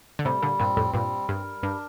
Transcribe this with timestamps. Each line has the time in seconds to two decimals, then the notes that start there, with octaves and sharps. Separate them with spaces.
0.19 D3
0.25 A2 C3 G3
0.42 A#2 D3
0.60 G2 A#2 C4
0.77 F2 A2
0.94 G2 A#2 G3
1.28 G2 A#4
1.63 G2 D4